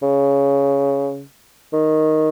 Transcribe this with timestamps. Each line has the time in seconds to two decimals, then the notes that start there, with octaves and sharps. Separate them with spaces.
0.02 C#3
1.73 D#3